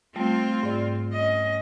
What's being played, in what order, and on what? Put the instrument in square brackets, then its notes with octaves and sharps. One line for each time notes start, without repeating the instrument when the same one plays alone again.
[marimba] G3 A3 [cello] C4 F4
[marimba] G#2 D5
[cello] C#4 D#5